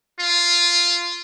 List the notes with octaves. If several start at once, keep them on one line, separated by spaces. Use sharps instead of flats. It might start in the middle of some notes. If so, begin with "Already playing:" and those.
F4